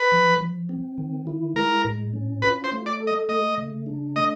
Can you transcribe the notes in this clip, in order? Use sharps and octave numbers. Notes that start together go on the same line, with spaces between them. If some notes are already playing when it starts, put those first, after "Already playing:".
Already playing: B4
F3
F3
C4
D#3
E4
G#3 A#4
A2
C#4
F4 B4
C5
A3
D5
A4
D#5
A3 D#5
C#3
D4
A3 D#5